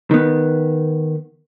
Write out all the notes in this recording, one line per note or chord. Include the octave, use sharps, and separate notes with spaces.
D#3 B3